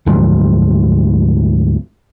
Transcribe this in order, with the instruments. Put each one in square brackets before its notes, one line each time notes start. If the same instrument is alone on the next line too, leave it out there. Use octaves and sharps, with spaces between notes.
[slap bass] D2 G#2 F3 F#3